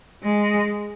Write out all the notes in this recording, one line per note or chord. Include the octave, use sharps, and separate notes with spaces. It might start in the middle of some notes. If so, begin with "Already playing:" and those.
G#3